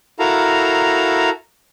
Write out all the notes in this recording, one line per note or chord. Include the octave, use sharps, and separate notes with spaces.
E4 F#4 A4 A#4 F5 A#5